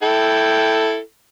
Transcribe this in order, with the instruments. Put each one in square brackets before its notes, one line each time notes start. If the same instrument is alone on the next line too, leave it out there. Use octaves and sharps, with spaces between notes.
[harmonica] E4 A4 G5